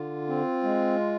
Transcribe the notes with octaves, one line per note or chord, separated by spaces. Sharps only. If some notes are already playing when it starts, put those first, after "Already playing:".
Already playing: D3 F4
C4
G#3